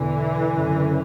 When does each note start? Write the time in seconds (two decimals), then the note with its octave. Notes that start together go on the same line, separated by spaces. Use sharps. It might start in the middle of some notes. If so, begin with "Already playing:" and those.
Already playing: E2 B2 D3 E3
0.55 F#2 C#3